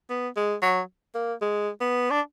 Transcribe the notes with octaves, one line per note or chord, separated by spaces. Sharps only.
B3
G#3
F#3
A#3
G#3
B3
D4